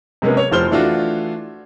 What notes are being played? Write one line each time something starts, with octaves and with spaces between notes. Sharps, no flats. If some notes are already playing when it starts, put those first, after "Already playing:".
C3 G#3 A#3 B3 C#4
C#5
F1 F3 C5 F6 G7
E3 A3 D4 F4 F#4